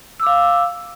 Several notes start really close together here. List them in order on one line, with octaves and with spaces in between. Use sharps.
E6 D6 F5